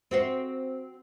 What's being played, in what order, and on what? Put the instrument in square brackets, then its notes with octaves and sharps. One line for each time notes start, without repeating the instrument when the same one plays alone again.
[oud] C4 F#4 C5